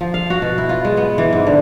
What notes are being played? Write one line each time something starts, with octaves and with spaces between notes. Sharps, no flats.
F3
F5
F#4
B2
E4
F4
G#3
B3
E3
G#2
D3